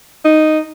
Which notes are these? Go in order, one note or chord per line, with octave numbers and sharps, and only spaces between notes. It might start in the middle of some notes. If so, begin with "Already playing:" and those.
D#4